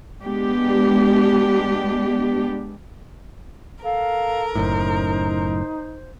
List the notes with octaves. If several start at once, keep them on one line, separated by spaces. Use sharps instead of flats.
G#3 B3 D4 G4
A4 A#4 F5
F#1 F#2 A2 D#4 C5